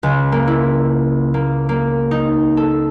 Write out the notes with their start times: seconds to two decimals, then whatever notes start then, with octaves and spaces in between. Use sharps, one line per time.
0.03 C#2
0.32 A#3
0.47 E4
1.34 A#3
1.69 A#3
2.11 D#4
2.57 A4